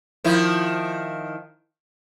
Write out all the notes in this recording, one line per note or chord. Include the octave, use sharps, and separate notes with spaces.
D#3 F3 E4